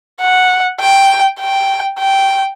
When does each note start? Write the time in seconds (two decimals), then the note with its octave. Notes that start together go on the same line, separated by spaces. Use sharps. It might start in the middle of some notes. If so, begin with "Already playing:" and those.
0.21 F#5
0.80 G5
1.40 G5
1.99 G5